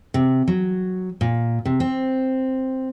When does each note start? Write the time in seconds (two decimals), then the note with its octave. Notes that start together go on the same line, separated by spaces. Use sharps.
0.14 C3
0.48 F#3
1.21 A#2
1.65 C3
1.80 C4